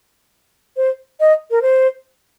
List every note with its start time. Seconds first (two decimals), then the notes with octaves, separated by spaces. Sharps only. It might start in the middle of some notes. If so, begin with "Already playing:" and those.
0.77 C5
1.20 D#5
1.51 A#4
1.62 C5